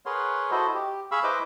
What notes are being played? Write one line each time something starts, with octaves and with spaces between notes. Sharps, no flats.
G#4 A#4 B4 C#5 F#5 C6
E4 F#4 A4 C5 D#5
G4
G#4 F5 B5 C#6 E6
E4 B4 C5 D#5 D6